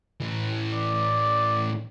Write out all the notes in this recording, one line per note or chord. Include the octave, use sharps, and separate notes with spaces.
A2 E3
D5